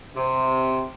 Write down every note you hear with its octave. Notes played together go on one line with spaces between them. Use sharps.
C3